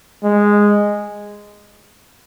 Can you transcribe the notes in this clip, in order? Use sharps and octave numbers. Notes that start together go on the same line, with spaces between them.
G#3